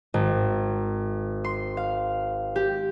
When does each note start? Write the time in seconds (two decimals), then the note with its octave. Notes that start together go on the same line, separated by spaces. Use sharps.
0.14 G#1
1.44 C6
1.77 F5
2.56 G4